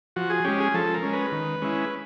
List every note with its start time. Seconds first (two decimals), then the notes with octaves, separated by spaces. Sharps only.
0.16 F3 F#4
0.30 G#4
0.44 G#3 C#4 G4
0.60 G#4
0.74 F3 A4
0.94 A#4
1.03 G#3 C#4
1.13 B4
1.32 D#3
1.62 G#3 C#4 E4